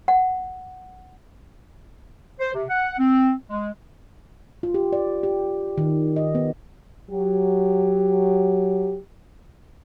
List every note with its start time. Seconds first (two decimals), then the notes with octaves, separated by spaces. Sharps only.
0.08 F#5
2.40 C5
2.54 C3
2.69 F#5
2.98 C4
3.50 G#3
4.63 F4
4.74 G4
4.93 D5
5.23 G4
5.78 D#3
6.16 D#5
6.35 B3
7.10 F#3 G4